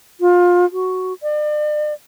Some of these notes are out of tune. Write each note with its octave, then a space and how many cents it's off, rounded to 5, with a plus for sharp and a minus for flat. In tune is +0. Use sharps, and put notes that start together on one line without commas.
F4 +25
F#4 +5
D5 +40